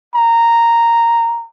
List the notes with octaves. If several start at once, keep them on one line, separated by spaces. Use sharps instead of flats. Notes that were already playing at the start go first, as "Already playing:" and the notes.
A#5